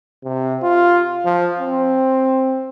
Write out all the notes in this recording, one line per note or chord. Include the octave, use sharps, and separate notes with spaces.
C3
F4
F3
C4